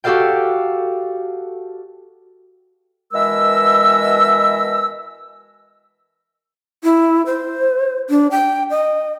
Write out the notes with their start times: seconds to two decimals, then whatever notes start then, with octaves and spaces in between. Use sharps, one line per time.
0.04 F#4 G4 A4 D5 F5 G5
3.13 B2 E3 G#3 A#4 E5 E6
6.84 E4
7.26 C5
8.10 D4
8.31 G5
8.70 D#5